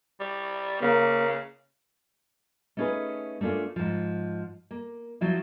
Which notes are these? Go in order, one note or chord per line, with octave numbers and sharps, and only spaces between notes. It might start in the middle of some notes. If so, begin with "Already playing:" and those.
G3
C#3 A#3
A3 B3 C#4 D#4 G#4 B4
A3 A#3 C#4 D4 F4
G#2 F3
A#3
F3 F#3 E4